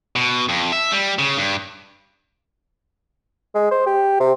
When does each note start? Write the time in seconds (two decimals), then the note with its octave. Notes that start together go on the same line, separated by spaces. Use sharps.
0.16 B2
0.49 F2
0.73 E5
0.92 G3
1.19 C#3
1.37 G2
3.55 G#3
3.71 C5
3.86 G4
4.20 C3